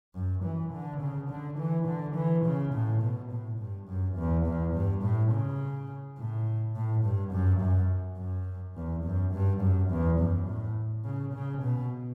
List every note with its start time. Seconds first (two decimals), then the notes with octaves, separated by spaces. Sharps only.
0.15 F#2
0.44 E3
0.73 D3
1.01 C#3
1.30 D3
1.59 E3
1.87 D3
2.16 E3
2.45 C#3
2.74 A2
3.02 B2
3.31 A2
3.59 G2
3.88 F#2
4.17 E2
4.46 E2
4.74 G2
5.03 A2
5.32 C#3
6.18 A2
6.75 A2
7.04 G2
7.32 F#2
7.60 F#2
8.18 F#2
8.76 E2
9.04 F#2
9.33 G2
9.61 F#2
9.90 E2
10.19 F#2
10.48 A2
11.05 C#3
11.34 C#3
11.62 B2